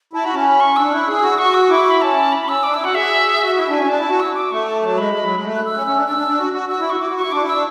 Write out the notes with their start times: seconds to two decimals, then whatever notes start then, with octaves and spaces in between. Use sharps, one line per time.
0.13 E4 A5
0.24 F#4 B5
0.34 C#4 A5
0.46 B5
0.60 C#6
0.76 D4 E6
0.92 E4 F#6
1.08 G#4 E6
1.23 F#4
1.38 F#4 C#6
1.54 E6
1.70 E4 D6
1.90 B5
2.01 C#4 A5
2.32 B5
2.47 C#4 E6
2.63 D4 D6
2.74 E4 E6
2.84 F#4 F#5
2.95 G#4 E5
3.25 G#4
3.42 F#4
3.57 E4 E5
3.68 D4
3.73 C#4 G#5
3.88 D4 A5
3.99 E4
4.10 F#4
4.20 E6
4.35 D6
4.51 A3 C#6
4.66 A5
4.82 F#3 A5
4.97 G#3 B5
5.13 G#3
5.24 F#3
5.35 G#3
5.44 A3
5.55 F#6
5.65 E6
5.76 C#4
5.87 C#4
5.97 D4
6.00 F#6
6.07 D4 E6
6.18 D4
6.28 D4
6.39 F#4
6.53 F#4
6.69 F#4 E6
6.80 E4
6.90 F#4 C#6
7.00 F#4 D6
7.11 F#4
7.17 E4 C#6
7.31 D4 D6
7.42 E4
7.48 D4 E6